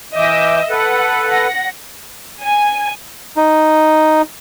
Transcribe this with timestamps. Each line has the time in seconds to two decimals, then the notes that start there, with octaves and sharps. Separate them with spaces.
0.16 E3 D#5 E5 D6 E6 G6
0.70 A4 B4 F#5
1.28 F#5 A#6
2.41 G#5
3.37 D#4